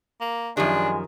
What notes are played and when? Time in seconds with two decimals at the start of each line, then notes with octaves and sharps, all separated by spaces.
0.21 A#3
0.57 F#2 D#3 F3 G#3 D4 G4